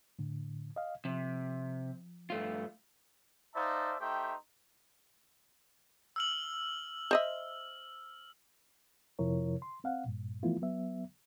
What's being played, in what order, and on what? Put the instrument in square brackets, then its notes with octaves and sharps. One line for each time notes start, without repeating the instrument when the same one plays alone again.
[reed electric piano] A2 D3
D#5 F5
[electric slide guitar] C3 [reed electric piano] F3
[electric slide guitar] G2 A3 F4
[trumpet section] D#4 C5 D5 E5 F5 A5
A3 D#4 G4 C5 E5 G5
[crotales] E6 F6 F#7
[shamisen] C5 D#5 E5
[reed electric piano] F2 C3 F3 E4 A#4 C#5
C6
C4 F5 F#5
G2 A#2
E3 F3 A3 B3 E4 F4
F#3 B3 E5